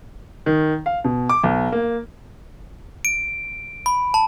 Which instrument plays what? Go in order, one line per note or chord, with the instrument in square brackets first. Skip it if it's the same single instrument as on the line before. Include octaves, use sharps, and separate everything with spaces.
[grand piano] D#3
F5
B2
D6
B1
A#3
[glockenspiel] D7
B5
A5